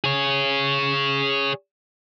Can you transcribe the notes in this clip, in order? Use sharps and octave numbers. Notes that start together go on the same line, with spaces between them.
G#4 C#5